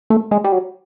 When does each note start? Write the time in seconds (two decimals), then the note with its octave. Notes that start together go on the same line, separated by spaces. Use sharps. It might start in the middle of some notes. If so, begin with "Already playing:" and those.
0.10 A3
0.31 G#3
0.44 G3
0.52 F#3